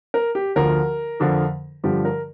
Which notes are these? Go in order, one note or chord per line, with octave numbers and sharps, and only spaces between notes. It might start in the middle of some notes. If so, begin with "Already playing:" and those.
A#4
G4
D2 D3 F3 A#4
F2 D3 F3
G2 D3 F3 G4
A#4